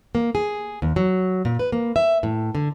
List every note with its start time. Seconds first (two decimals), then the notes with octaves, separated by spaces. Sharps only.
0.15 A#3
0.35 G#4
0.82 D#2
0.96 F#3
1.45 A#2
1.59 B4
1.72 A#3
1.96 E5
2.23 A2
2.55 D3